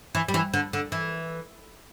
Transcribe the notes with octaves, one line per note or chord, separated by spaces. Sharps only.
E3
G3
E3
D3
D3
E3